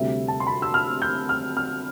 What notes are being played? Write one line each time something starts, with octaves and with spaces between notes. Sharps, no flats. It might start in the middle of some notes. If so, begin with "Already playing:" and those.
Already playing: D2 C3 G3 E5
A5
C6
B5
E6
F6
G6
F6
F6